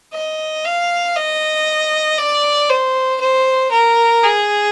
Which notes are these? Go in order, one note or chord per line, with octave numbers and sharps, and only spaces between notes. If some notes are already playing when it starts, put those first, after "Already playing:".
D#5
F5
D#5
D5
C5
C5
A#4
G#4